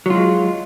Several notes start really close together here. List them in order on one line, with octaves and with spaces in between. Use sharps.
F#3 F4 G#3